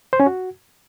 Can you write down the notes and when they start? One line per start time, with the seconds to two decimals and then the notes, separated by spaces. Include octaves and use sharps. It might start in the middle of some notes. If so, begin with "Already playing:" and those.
0.13 C5
0.20 C#4
0.26 F#4